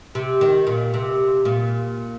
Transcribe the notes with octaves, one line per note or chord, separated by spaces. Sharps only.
C3
D#3
A#2
C3
A#2